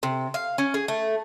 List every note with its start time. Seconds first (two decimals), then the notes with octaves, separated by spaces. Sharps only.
0.03 C3
0.34 F5
0.58 C#4
0.74 G#4
0.88 A3